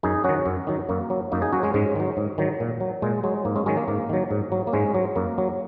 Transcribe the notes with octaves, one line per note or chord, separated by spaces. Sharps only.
F#2 D#4 G#4
D#3 F#3 C#4 F#4
F#2
D#3 F#3
F#2 A#3
F#3
F#2 A#3 D#4
D#4 G#4
F#3 C#4 F#4
G#3 C#4
G#2 G#3 C#4
D#3 F#3
G#2
D#3 F#3
A#2
F#3
A#2 G#3
F#3 G#3
G#2 A#3
G#3 C#4
D#3 F#3 G#3 C#4
A#3
G#2 A#3
D#3 F#3
G#2
F#3
A#3
G#2 G#3 C#4
F#3
F#2 A#3
F#3